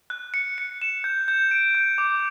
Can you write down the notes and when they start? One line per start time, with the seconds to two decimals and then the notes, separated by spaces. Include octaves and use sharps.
0.10 F#6
0.34 C#7
0.58 C#7
0.82 E7
1.04 G6
1.28 G6
1.51 D7
1.75 G6
1.98 D6